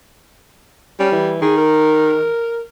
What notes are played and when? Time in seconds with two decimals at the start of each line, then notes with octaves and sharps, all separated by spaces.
1.00 G3 C#4
1.12 E3
1.42 D#3 G#4
1.57 A#4